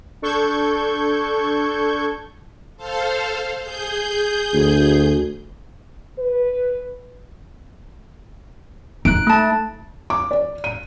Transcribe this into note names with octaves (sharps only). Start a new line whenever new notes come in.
D4 A4 C#6 G6 G#6
A4 C5 F5
G#4 G6
D2
B4
D#4 F#6 D7
A3 A5
D6
D5
D#7